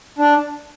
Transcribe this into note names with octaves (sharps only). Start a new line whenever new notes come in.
D4